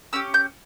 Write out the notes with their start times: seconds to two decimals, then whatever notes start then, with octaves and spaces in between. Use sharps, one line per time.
0.13 C#4 G4 E6
0.34 G6